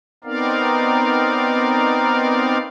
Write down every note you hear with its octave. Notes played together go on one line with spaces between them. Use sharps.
B3 C4 D#4 A#4 D5 F5